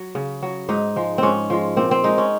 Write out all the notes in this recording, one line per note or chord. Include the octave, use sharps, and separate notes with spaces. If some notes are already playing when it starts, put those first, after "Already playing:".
Already playing: F#3
C#3
F#3
G#2 D#4
F3 G#3
G#2 C4 C#4
F3 G#3
A#2 C4
C4
G#3 D#4
C#4